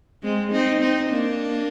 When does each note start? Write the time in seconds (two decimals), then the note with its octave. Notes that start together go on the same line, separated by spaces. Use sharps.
0.23 G#3 C4
0.52 C4 D#4
0.81 C4 D#4
1.10 A#3 D4